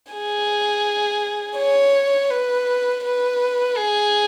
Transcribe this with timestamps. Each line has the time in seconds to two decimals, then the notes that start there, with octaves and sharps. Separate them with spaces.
0.12 G#4
1.58 C#5
2.30 B4
3.04 B4
3.77 G#4